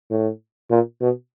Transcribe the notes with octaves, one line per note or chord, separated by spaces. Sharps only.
A2
A#2
B2